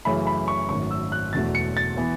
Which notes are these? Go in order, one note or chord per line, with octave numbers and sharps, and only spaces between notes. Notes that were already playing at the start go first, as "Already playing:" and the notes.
F#2 C#3 E3 A3 B5
B5
C#6
G#1 F#2 D#3 A3 C#6
E6
F#6
E1 E2 B2 F#3 A3 A6
C#7
A6
E3 B3